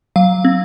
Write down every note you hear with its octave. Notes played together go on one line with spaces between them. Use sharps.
F#3 F5
C4